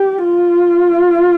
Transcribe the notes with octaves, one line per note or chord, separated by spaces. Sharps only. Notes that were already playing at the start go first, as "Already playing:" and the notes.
Already playing: G4
F4